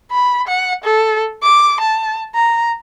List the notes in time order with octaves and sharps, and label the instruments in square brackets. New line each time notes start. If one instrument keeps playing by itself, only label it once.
[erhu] B5
F#5
A4
D6
A5
A#5